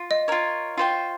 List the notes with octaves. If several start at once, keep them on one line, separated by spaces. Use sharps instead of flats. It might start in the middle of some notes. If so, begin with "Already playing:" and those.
Already playing: F4
D#5
F4 A#4 C#5
F4 C5 G5 C#6